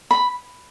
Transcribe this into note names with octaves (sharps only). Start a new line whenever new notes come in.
B5